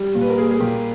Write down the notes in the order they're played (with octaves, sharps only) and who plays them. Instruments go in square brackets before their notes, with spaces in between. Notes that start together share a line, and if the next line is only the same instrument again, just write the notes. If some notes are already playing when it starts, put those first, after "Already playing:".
Already playing: [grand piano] G3
A#2
[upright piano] B4
A#4
[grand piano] A#3 [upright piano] G#4
[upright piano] G#4
[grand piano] A#2 [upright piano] G4